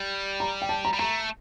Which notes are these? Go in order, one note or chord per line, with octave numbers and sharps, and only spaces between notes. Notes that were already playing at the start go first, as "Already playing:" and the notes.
Already playing: G3
A#5
G5
A5
A#5
G3
A3 A#5